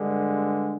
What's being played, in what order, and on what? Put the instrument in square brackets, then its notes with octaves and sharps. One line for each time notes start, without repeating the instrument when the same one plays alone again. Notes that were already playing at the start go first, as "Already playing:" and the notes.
Already playing: [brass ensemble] G2 D3 G#3 D4